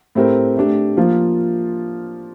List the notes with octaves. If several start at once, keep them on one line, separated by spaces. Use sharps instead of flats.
A2 A3 C4 G4 A#4
A3 D4 G4
F3 A#3 F4